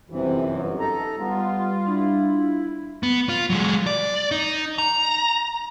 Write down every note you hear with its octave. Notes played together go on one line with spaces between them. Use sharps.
G1 F#2 C3 E3
D#4 A4 A#5
G3 B3 F4
D4 E4
B3
F4
F#3 G#3
D5
D#4
A#5